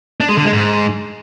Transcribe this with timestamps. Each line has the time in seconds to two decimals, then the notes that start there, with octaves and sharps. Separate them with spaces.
0.20 D4
0.29 G#3
0.37 D3
0.45 G#3
0.53 G#2